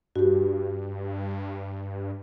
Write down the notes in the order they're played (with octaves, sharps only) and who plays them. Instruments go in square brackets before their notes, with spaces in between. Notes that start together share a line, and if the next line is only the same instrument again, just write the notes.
[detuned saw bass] G2 [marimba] F#4 G4